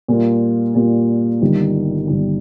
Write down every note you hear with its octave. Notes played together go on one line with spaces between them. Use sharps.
A#2 G3 A#3 F4
A#2 G3 A#3 F4
G1 G2 D#3 G3
G1 G2 D#3 G3